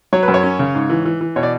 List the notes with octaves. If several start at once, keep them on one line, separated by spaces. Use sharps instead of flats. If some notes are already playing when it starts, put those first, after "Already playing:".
F#3 C#5
B4
F#2
C#5
C#4
C#3
G#2
E3
E3
E3
B2 C#5
D5